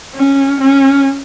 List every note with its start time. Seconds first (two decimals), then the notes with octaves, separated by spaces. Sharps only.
0.15 C#4
0.60 C#4